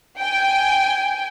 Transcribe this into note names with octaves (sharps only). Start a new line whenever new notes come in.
G5 G#5